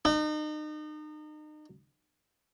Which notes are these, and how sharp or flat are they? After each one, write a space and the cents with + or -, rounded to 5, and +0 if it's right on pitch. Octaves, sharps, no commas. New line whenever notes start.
D#4 -35